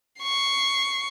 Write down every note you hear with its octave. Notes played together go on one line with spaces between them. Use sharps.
C#6 C7